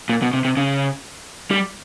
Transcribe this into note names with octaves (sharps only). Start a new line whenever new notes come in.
A#2
B2
C3
C3
C#3
G3